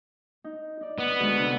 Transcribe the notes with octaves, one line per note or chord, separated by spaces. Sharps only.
D#4
D#4 D5
B3
D2 G#3
C3 D4 A4